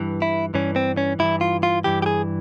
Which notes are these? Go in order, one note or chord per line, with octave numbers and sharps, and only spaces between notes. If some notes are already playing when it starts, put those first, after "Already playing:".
Already playing: G2 E3
E4
G2 E3 C#4
C4
C#4
G2 E3 E4
F4
F4
G2 E3 G4
G4
G#4